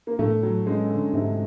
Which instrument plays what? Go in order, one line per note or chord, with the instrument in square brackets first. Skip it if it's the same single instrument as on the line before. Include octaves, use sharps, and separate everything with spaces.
[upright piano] A#3
[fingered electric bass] A2 [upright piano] A3
[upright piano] F#3
[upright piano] G#3 [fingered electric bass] C#4
[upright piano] D3
[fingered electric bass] G#2 [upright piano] C3